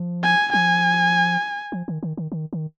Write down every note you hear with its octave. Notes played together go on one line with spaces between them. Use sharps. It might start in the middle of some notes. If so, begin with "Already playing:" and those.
Already playing: F3
G#5
F3 G#5
F3
D#3
D#3
D#3
D#3
D#3